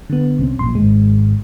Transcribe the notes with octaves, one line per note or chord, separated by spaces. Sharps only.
D3 B3
C2 C4 C#4
A#1 F#2 A#2 C6
D#1 G#1 G#3